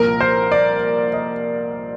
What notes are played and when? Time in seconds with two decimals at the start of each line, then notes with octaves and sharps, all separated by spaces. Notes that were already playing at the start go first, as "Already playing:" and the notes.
Already playing: C2 A#2 F3 A#4
0.21 C5
0.51 D5
1.13 D#5